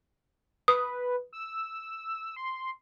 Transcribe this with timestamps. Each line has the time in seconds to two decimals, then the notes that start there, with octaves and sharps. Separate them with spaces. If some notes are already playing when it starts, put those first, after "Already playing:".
0.68 B4 D#6
1.33 E6
2.36 C6